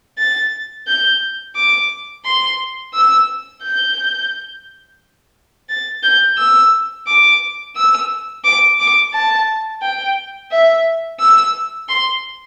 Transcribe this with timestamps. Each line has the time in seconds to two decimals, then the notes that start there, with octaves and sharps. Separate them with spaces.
0.18 A6
0.87 G6
1.56 D6
2.25 C6
2.94 E6
3.63 G6
5.69 A6
6.03 G6
6.38 E6
7.07 D6
7.76 E6
8.45 D6
8.80 D6
9.13 A5
9.82 G5
10.52 E5
11.20 E6
11.89 C6